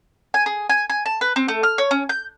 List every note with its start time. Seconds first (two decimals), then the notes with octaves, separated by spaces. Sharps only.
0.34 G#5
0.46 G#4
0.69 G#5
0.90 G#5
1.06 A5
1.21 B4
1.36 C4
1.48 A3
1.63 F6
1.78 C#5
1.91 C#4
2.09 G6